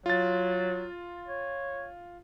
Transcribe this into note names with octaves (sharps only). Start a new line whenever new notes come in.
F#3 F4 A6
C#5